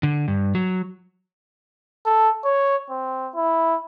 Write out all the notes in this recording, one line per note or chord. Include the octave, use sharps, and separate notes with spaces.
D3
G2
F#3
A4
C#5
C4
E4